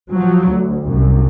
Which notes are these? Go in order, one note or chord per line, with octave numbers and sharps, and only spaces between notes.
F3 F#3
D2
C2 F#2